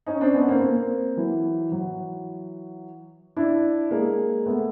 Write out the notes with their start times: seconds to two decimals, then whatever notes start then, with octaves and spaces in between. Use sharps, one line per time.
0.06 C#4 D#4
0.21 C4 D4
0.34 B3 C#4
0.48 A#3 C4
0.61 A#3 C4
1.17 E3 F#3
1.72 E3 F#3
3.36 D4 E4
3.91 G#3 A#3
4.46 A3 B3